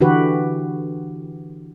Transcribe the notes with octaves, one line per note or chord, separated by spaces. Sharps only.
D3 E3 F#4 G4 B4